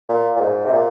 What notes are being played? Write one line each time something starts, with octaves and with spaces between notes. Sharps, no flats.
A#2
A#2
G#2
C3
A#2